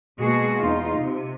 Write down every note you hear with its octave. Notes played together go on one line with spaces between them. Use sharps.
B2 G#3 A#3 F#4 G#4
E2 D#4 F4
C3